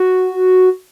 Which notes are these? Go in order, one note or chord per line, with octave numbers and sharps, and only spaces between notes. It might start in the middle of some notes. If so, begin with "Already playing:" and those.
Already playing: F#4